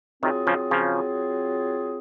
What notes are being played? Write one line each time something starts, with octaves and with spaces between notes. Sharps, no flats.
C3 D#3 F#3 C4 F4 G#4
C#3 F3
C#3 F3